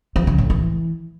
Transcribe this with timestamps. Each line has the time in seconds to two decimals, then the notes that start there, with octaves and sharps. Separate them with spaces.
0.16 F3
0.27 C#3
0.38 A2
0.50 E3